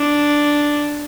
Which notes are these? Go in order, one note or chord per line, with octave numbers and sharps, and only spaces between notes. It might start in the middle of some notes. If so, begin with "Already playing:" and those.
Already playing: D4